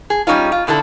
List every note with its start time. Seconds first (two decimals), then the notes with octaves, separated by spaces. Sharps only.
0.10 G#4
0.27 G3 G#3 C#4 D#4 F4
0.52 F4
0.67 B2 D3 E4 A4